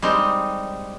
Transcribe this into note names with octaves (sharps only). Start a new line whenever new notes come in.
G3 G#3 C4 D#4